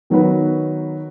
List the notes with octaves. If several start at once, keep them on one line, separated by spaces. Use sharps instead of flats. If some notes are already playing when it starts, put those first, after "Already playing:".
D#3 F#3 B3 F#4 B4